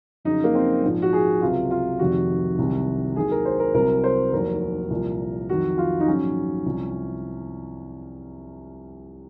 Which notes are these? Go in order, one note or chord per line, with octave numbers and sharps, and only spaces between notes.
F2 C#3 F#3 D#4
A#3
C4
A#1 G#2 F3
F#4
G#4
C#2 C3 F#3 F4
F4
F1 F2 C3 D#3 F#4
C2 C3 D#3 F#3
D#2 D#3 F#3 G#4
A#4
C5
A#4
C2 C3 F#3 A#4
C5
F1 D#2 D#3 F#3 A#4
C2 A#2 F3
F2 D#3 F#3 F#4
F4
D#4
A#1 G#2 F#3 C#4
C2 C3 F3